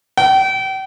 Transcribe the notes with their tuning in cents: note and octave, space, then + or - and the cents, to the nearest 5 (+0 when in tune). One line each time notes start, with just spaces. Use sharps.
G5 -35